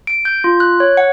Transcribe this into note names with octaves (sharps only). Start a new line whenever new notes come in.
D7
G6
F4
F#6
C#5
F#5